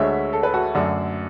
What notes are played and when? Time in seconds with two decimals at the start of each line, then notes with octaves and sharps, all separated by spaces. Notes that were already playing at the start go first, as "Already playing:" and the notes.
Already playing: D2 D3 G#3 C#5 E5
0.33 A4
0.43 B4
0.54 F#4 A4
0.75 F#2 D3 A3 D4